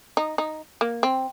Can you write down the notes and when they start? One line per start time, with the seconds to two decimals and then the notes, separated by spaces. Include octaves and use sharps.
0.17 D#4
0.38 D#4
0.81 A#3
1.03 C4